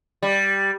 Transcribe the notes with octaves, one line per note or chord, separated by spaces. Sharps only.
G3